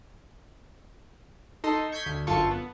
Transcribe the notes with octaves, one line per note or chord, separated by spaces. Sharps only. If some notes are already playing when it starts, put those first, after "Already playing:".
D#4 A4 D#5 C6
C#6 G6 G#6 B6 C7 D#7
D2
G1 F#2 F4 A4 A5 C#6
B3